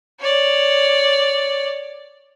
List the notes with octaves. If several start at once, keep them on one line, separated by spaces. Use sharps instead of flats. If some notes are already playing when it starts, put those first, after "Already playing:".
C#5 D5